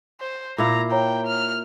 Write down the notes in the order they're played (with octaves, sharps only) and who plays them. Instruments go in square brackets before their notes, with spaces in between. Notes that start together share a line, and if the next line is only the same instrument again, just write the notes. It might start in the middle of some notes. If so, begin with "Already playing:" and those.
[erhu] C5
[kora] A#2 E4 F5 [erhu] A#5
[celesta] C#5 A#5 [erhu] G5
[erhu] F6